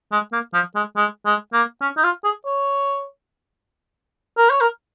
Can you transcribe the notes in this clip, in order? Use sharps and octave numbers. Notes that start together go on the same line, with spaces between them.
G#3
A#3
F3
G#3
G#3
G#3
A#3
C#4
D#4
F4
G#4
C#5
A#4
C#5
A#4